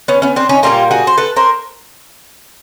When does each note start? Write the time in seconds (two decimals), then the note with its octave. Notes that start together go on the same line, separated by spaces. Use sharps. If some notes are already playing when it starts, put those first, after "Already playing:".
0.08 B3 C#4
0.22 B3 C#4
0.36 C4 D4
0.49 C#4 D#4
0.63 A#2 G3 A#3 F4 G4
0.91 F#4 G#4
1.07 C5
1.17 A4 B4
1.36 A#4 C5